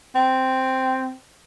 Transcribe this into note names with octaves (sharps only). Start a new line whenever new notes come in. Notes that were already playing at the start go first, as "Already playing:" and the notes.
C4